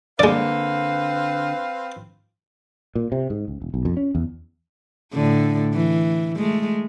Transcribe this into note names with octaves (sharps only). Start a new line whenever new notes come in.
D3 G#3 A#3 C4 B4 D5 F5
A#2
C3
G#2
C#2
E1
B1
F2
C#4
E2
A2 D3
E3
G#3 A3